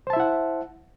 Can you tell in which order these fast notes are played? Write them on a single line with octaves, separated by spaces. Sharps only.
C5 A5 E5 E4 F#5